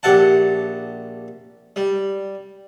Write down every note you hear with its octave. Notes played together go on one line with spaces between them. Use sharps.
A#1 G4 E5 F#5 A5
G3